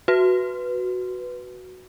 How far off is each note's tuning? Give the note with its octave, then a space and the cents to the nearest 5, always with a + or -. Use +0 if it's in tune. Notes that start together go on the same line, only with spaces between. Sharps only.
F#4 +0 B4 +0